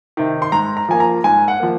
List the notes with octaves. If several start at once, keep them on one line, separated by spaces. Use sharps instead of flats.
C3 D#3
C6
G#2 A#5
A#5
F3 A#3 G#5
A#5
G#2 G#5
F#5
F3 A#3